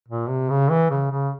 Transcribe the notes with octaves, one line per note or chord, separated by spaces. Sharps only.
A#2
C3
C#3
E3
C#3
C#3